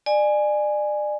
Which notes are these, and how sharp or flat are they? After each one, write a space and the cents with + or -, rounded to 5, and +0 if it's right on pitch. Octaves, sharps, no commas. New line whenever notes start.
D5 +30 G#5 +0